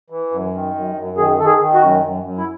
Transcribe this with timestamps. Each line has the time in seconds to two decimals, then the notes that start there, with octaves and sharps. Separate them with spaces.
0.10 E3
0.31 F#2
0.54 D#3
0.74 F#2
0.96 F#2
1.17 D#3 G#4
1.39 D#3 A4
1.46 G#4
1.60 D#3
1.74 F#4
1.81 F#2
2.03 F#2
2.23 F#2
2.37 E4